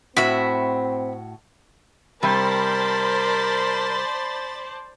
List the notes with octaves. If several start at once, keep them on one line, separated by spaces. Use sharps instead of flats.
A2 C4 F#4 E5 B5
C3 G3 A#4 C5 D5 A5 B5 A6